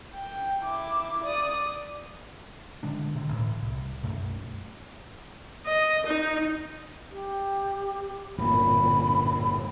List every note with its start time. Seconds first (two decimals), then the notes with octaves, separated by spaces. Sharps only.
0.15 G5
0.64 E4 D6
1.24 D5 D#6
2.83 D3 G#3 D4
3.15 B2 D3 D#3
3.28 A1 A2
3.61 C2
4.03 B1 F#2 A3
5.67 D#5
6.06 D#4
7.11 G4
8.38 D1 G1 A#2 B5